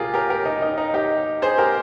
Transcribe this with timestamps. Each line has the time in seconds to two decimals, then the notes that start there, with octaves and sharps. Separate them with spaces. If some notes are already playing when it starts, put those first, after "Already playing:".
Already playing: C2 A#2 G#3 F4 G4 G#4 A#4
0.14 G4 A#4
0.30 G4 A#4
0.46 D#4
0.62 D#4
0.78 D#4
0.94 D#4 G4
1.42 G#4 C5
1.58 G4 A#4